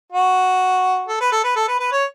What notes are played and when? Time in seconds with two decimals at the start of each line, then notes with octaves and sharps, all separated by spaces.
0.12 F#4
1.07 A4
1.20 B4
1.32 A4
1.43 B4
1.56 A4
1.68 B4
1.79 B4
1.92 C#5